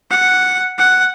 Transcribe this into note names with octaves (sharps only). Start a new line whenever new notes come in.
F#5
F#5